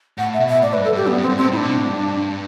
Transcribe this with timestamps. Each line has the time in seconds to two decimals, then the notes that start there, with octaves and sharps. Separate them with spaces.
0.18 A2 F#5
0.33 E5
0.40 B2
0.48 E5
0.62 A2 D5
0.73 B4
0.77 G2
0.85 A4
0.93 G2 G4
1.07 F#2 B3
1.18 G2
1.22 C4
1.29 G2
1.37 A2 C4
1.52 A2 E4
1.57 D4
1.63 B2
1.74 A2
1.86 G2